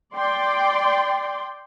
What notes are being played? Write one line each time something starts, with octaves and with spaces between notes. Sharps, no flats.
D5 G5 C6